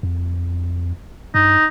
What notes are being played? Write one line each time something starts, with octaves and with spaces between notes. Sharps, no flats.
F2
G2 D#4